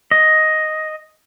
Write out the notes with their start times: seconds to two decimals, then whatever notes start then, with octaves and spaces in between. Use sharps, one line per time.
0.11 D#5